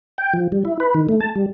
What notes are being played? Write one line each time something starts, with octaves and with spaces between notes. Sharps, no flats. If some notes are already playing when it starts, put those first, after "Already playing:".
G5
F3
G3
E4
B4
D#3
A3
A5
G3